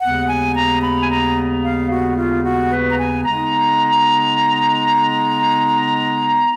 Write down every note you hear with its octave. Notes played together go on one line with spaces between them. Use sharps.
D#2 C#3 G#3 B3 F#5
G#5
A#5
B5
G#5
A#5
F5
F#4
F4
F#4
B4
A#5
G#5
C#3 G#3 B3 D#4 A#5